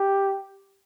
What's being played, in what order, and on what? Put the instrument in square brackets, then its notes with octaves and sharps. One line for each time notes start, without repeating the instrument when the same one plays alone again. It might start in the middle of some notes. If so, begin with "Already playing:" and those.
Already playing: [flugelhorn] G4